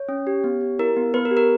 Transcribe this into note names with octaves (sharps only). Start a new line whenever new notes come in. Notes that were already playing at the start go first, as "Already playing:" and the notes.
Already playing: C#5
C#4
G4
B3
G4
E4 A#4
B3
B3 B4
A#4
G4
A#4